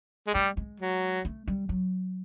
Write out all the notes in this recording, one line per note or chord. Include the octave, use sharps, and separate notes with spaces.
G#3
G3 A3
G#3
F#3
A3
G3
F#3